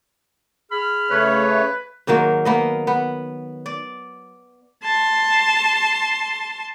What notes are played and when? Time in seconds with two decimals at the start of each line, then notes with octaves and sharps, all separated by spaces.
0.71 G#4 B5 F6
1.11 C#3 A3 B4 C#5
2.07 G#2 D#3 F#3 A#3
2.45 A#3 B3 D#5
2.87 B3
3.66 D5
4.83 A5 C6